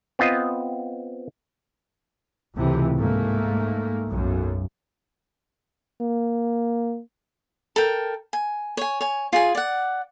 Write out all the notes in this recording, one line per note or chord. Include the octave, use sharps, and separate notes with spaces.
B3 C4 F4 D#5
C#2 A2 C3 E3
G#2 A3 A#3
B1 F#2
A#3
A4 A#4 G5
G#5
C#5 G#5
C#5 G#5
F4 G#4 G#5
D5 F#5